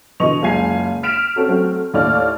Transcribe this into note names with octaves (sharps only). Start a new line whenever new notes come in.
B2 D3 E3 D#5 C#6 F7
F#1 C#2 G#5 C7
F6 B6 D7 E7 F7
C4 C#4 F#4 A4
F#3 A3 C4 F#4
D#2 A2 C#5 D5 F6